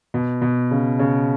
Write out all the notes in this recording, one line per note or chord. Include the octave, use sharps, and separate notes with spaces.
B2
B2
C#3
C#3